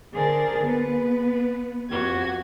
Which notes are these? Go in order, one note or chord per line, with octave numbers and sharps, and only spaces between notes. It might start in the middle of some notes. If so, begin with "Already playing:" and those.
D3 G#4 A#4 C5 A6
B3 B4
F2 F#4 G4 G#6